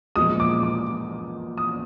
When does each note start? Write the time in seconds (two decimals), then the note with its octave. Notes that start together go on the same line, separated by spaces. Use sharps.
0.16 A#2 F3 G#3 D#6
0.40 D6
0.63 D6
1.58 D#6